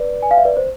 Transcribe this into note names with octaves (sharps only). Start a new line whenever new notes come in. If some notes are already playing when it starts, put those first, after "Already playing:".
Already playing: B4 D5
G#5
F5
E5
B4 D5
C5